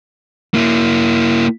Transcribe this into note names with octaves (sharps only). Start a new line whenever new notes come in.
A#3 E4